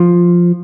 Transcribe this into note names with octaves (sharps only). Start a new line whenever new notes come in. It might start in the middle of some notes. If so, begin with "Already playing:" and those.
Already playing: F3